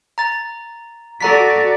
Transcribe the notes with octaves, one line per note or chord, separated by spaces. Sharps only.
A#5 A6
F#4 A4 D5 A#5 B6